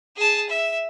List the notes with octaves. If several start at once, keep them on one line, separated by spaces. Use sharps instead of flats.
G#4 A5
E5